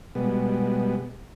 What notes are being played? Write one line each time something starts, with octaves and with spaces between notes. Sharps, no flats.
B2 G3 G#3 B3